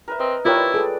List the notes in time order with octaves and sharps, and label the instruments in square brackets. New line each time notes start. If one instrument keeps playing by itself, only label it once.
[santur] A#4 B4 E5
[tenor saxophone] C4 [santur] D#5
[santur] G3 B4 D5 [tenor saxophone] E4 [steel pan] F4 A#4 C#5
[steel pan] G#4 A4